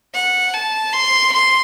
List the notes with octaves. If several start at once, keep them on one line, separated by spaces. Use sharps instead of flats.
F#5
A5
C6
C6